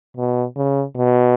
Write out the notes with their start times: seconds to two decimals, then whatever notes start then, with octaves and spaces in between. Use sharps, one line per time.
0.17 B2
0.56 C#3
0.96 B2